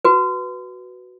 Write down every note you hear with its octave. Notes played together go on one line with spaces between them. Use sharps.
F#4 B4